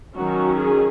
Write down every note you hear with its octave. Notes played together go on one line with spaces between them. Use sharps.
D#3 F#3 C#4 F#4
G#4